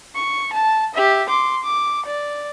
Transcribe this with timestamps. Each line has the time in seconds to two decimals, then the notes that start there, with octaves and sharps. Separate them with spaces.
0.15 C#6
0.53 A5
0.95 G4 E5
1.29 C6 D6
1.63 D6
2.06 D5